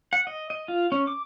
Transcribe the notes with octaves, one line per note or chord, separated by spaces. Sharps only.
F#5
D#5
D#5
F4
C#4
D6